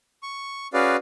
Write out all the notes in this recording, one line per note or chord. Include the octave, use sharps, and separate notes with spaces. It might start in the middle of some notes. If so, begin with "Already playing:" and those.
C#6
C#4 F#4 G#4 B4 D5 F5